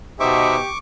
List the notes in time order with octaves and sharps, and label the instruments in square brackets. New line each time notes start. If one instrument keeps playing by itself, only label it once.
[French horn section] B2 [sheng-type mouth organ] D#4 C5 E5 [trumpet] G4 [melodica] C#6 D6